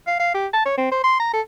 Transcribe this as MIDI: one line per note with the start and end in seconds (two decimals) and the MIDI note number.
0.07 0.16 77
0.19 0.33 77
0.34 0.47 67
0.53 0.62 81
0.65 0.73 73
0.77 0.91 60
0.91 1.03 72
1.04 1.16 84
1.20 1.32 82
1.33 1.41 69